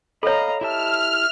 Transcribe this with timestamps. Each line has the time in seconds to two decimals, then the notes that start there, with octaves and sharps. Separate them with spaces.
0.23 A4 C#5 D#5 F5 A#5 B5
0.61 E4 G4 E5 A5 F6